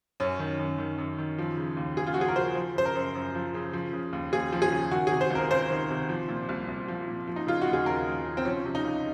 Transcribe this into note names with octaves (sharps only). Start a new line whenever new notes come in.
F#2 C#4
D#3
F#2
D#3
F#2
D#3
F3
C#3
D#2
D#2 G#4
F4
F#4
F3 G#4
A#4
C#3 C5
F3
C#3 C5
A#4
F#2
F#2
F3
C#3
F3
C#3
D#2
D#2 G#4
F3
G#4
C#3
D#3 F#4
C3 G#4
C5
C#2 A#4
C#2 C5
D#3
C3
F3
A#2
C2
C2
F3
A#2
F3
D#4
C#3 F4
F#4
D#2
G#4
D#2 A#4
F3
C#3
C4
F3 C#4
C3
D#4
C#2